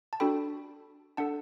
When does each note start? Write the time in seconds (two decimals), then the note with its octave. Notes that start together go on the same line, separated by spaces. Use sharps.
0.13 A5
0.20 D4 F#4 A4 G5 B5
1.17 D4 A4 F#5 A5